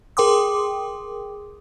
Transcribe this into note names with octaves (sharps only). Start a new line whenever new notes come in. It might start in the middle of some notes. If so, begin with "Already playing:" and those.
G#4 A#4 G5 C6 D6 D#6